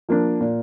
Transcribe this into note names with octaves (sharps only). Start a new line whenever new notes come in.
F3 A#3 D4
A#2